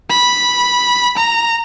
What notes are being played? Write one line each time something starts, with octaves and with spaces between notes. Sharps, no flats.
B5
A#5